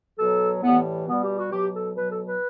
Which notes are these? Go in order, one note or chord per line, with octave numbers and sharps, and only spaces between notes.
B2 F#3 A4
A2 E3 G3 B3
B2 G3 B3
G4
F#4
B2 F#3 G4
A4
B2 F#3 B4
A4
B4